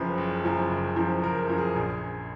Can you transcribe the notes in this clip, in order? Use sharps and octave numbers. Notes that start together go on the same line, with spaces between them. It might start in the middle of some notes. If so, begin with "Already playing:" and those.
Already playing: F#1 F#2 F3 B4
F#1
F#2 F3
F#1
F#2 F3
F#1 A#4
F#2 F3
G#4
A#1 G#4